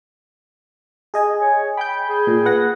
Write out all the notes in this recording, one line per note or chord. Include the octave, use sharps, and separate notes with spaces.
G#4 D#5 G#5
C#5
G5 B5 G6
G#4
A#2
B4 F#5 A#6